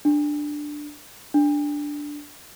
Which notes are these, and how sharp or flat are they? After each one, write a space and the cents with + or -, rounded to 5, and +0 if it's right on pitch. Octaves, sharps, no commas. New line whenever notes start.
D4 +10
D4 +0